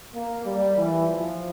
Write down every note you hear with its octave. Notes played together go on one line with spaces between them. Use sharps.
A#3
G3
E3
F3